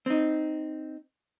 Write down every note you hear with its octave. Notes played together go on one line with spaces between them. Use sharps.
C4 D#4